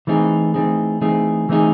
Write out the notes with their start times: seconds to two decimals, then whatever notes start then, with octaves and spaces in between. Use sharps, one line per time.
0.07 E3 A3 C4 D#4 G#4
0.54 E3 A3 C4 D#4 G#4
1.02 E3 A3 C4 D#4 G#4
1.49 E3 A3 C4 D#4 G#4